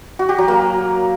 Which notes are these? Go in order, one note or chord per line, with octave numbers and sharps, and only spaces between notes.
F#4
G4
F#3
A#3